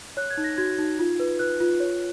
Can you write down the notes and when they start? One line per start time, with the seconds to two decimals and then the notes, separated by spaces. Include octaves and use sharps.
0.17 C#5 F#6
0.30 G#6
0.38 D#4
0.44 A#6
0.58 F#4 G#6
0.79 D#4
0.99 F4
1.19 B4
1.39 B4 F#6
1.60 F4
1.80 C#5